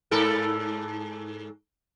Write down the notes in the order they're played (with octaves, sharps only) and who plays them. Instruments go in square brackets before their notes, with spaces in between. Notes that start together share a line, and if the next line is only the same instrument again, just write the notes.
[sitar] G#2 A4 A#4